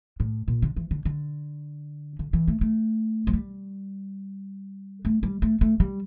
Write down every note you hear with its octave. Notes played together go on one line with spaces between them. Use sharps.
A2
A#2
D3
E3
D3
D3
D3
E3
A3
A3
F3
G3
A3
G3
A3
A3
G3